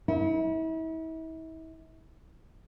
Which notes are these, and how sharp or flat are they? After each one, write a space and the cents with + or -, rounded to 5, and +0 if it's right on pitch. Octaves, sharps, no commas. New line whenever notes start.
E4 -40